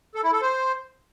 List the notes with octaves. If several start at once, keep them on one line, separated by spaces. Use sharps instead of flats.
A4
E4
A4
C5